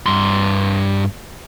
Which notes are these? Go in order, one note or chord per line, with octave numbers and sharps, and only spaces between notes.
G2 C6